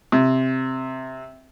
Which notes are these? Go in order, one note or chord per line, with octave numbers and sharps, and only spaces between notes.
C3